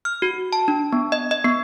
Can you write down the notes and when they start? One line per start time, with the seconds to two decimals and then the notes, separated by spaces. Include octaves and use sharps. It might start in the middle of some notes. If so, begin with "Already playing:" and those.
0.05 F6
0.22 F#4
0.53 A5
0.68 D4
0.93 B3
1.12 D#5
1.31 D#5
1.45 B3